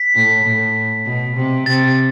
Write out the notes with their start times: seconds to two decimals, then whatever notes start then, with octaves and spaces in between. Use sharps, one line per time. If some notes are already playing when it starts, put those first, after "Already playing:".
Already playing: B6
0.15 A2
0.45 A2
1.06 B2
1.36 C3
1.66 C3 A6